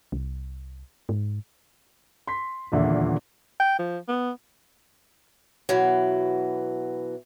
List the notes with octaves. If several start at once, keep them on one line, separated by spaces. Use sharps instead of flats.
C2
G#2
C6 B6
D#1 E2 A#2 D3 E5
G5
F3
B3
B2 E3 F#3